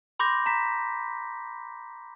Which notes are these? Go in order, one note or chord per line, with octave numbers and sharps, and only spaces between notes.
B5 C6 D6 G6 A#6
A#5 B6